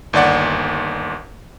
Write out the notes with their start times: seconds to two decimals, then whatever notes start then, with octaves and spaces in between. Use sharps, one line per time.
0.13 G1 D#2 D5 F#5